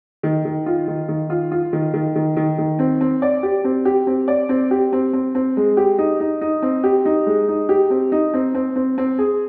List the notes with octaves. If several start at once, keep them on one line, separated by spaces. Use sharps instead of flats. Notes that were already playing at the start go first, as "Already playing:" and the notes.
D#3
D#3
F4
D#3
D#3
F4
F4
D#3
D#3
D#3
D#3
D#3
C4
C4
D5
G4
C4
G4
C4
D5
C4
G4
C4
C4
C4
G#3
G4
D#4
D#4
D#4
C4
G4
D#4
G#3
D#4
G4
C4
D#4
C4
C4
C4
C4
G#4